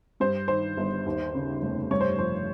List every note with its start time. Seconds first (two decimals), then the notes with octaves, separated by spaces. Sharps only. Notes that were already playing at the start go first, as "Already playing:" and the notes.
0.20 G2 C5
0.48 D#3 C5
0.77 G1
1.06 D#2
1.34 C#3
1.62 F1
1.91 G2 C#5
2.01 C5
2.19 F3 C5